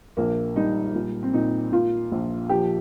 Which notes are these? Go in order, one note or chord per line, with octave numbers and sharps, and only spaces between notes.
A#1 A#3
G3 D#4
A#2
C4
A#2 D#4
A#2 F4
A#1
F3 G4